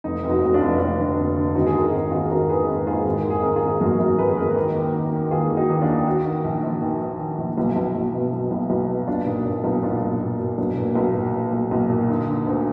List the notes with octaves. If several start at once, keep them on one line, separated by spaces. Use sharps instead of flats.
F1 D#4
F1
D#4 F#4
F1 F#4
D4 F4
F1
F1 D4 F4
D3
F1
D3
G#1 D#4 F#4
G#4
D#3 F#4 A#4
G#1
G#1 F4 G#4
G#1 F#4 A#4
D#3 G#4 B4
G#1
G#2 F4 G#4
G#1 G#4
A#4
D#3
G#4
G#1 A#4
F4 G#4
G#1
F#2 F#4 A#4
F#2 F#4 A#4
G#1 G#4 B4
G#4
G#1 F#4 A#4
D#2
D#2
D#3
D#3
D#2 F4 G#4
D#2
D#4 F#4
D#2
D4 F4
D#3
D#3 D#4 F#4
D#3
A#1
A#1
D#3
D#3
D#3
A#1
B1
B1
B1
B2
B1
B1
B1
B2
B1 D4 F4
A#2 D#4
A#2 D4
B1 D#4
A#2 D4 F4
B1
A#2
A#2
B1 D4
A#2
B1
A#2
A#2
B1
B1
A#2
D3 D#4
D3
D2